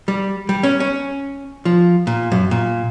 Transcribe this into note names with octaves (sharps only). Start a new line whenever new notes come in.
G3
G3
C#4
C#4
F3
A#2
F#2
A#2